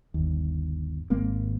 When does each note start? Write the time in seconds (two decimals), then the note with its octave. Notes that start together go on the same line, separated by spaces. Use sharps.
0.14 G1 D#2
1.10 G#1 G#3 A#3 C4